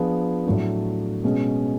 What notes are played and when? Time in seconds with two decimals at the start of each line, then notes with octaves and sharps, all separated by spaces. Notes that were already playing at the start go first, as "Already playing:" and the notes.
Already playing: F3 B3 D4 F4 G#4
0.46 A2 F#3 A3 D4
1.24 B2 G#3 C#4